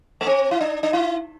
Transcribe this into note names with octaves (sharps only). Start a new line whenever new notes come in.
A3
C4
E4
D4
D4
E4